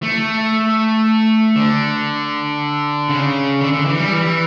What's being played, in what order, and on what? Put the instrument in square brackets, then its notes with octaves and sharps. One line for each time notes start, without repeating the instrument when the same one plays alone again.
[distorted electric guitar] A3
D3
C#3
D3
D3
E3
G3
E3